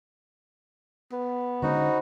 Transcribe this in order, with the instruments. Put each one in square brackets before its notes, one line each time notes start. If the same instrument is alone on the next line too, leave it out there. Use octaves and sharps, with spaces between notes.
[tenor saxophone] B3
[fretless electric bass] D3 G#3 C#4 [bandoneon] D#4 F#4 [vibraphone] C5 B5